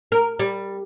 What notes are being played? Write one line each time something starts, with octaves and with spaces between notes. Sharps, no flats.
A#4
G3